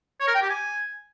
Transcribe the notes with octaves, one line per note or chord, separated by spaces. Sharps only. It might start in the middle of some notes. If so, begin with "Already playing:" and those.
C#5
A#4
G5
G4
G#5